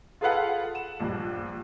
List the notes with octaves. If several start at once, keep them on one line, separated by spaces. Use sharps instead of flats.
F4 G#4 A4 B4 F5 F#5
E7
A#1 G2